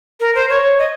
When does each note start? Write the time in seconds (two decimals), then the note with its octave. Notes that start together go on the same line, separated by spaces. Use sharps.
0.20 A#4
0.35 C5
0.49 C#5
0.79 D#5